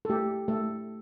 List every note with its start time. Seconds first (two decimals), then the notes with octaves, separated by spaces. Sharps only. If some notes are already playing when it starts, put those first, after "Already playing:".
0.05 A4
0.09 A3 G4
0.48 A3 A4